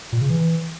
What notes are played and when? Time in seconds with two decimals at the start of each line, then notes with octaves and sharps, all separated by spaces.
0.12 A#2
0.21 C#3
0.30 E3